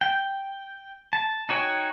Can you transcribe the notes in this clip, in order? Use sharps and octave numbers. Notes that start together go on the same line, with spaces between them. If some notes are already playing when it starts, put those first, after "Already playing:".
G5
A5
D#4 F#4 C#5 G5 G#5